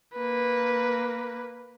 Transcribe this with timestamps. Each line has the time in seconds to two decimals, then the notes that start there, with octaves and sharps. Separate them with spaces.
0.14 A#3 B4